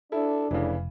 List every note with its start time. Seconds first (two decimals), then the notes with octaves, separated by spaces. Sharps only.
0.12 D4 E4 A4
0.51 F1 A2 C#3 E3